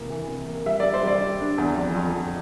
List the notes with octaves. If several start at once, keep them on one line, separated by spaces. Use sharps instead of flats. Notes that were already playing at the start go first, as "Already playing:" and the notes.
Already playing: C3 E3 A#3
E3
C3
A#3
G3 E5
G3 D5
C5
G3 D5
G3
D4
E2
F2
F2
F2